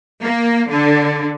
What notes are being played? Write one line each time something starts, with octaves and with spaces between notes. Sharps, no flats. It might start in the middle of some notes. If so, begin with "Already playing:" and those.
A#3
D3